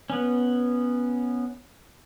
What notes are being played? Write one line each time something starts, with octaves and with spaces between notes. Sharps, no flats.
B3 C#4